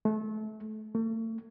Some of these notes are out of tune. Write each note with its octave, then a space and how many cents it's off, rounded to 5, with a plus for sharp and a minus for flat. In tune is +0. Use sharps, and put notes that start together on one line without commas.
A3 -25
A3 +40